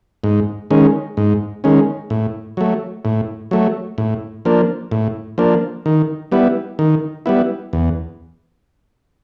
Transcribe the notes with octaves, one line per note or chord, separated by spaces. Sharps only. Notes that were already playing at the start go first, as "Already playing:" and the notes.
G#2
D#3 G#3 C#4
G#2
D#3 G#3 C#4
A2
F#3 A3
A2
F#3 A3
A2
F3 A#3 D4
A2
F3 A#3 D4
D#3
G3 B3 E4
D#3
G3 B3 E4
E2